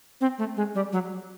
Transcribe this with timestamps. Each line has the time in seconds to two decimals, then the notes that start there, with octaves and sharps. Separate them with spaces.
0.21 C4
0.38 A3
0.57 G#3
0.75 G3
0.93 F#3